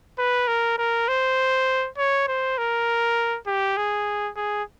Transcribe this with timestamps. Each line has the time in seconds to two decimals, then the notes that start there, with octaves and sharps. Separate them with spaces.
0.19 B4
0.48 A#4
0.78 A#4
1.08 C5
1.98 C#5
2.28 C5
2.58 A#4
3.47 G4
3.77 G#4
4.36 G#4